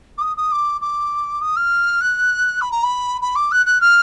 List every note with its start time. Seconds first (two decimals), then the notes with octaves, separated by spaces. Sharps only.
0.17 D6
0.21 D#6
0.36 D#6
0.51 D6
0.81 D6
1.41 D#6
1.56 F6
2.01 F#6
2.61 B5
2.71 A#5
2.83 B5
3.21 B5
3.35 D6
3.51 F#6
3.66 F#6
3.80 F6